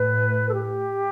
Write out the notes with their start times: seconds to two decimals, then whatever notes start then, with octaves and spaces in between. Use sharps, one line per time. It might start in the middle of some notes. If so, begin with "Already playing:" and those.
Already playing: A2 A3 B4
0.49 A4
0.54 G4